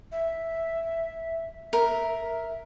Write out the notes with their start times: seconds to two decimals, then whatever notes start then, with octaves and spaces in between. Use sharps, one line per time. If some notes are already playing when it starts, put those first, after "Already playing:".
0.12 E5
1.73 A#4 E5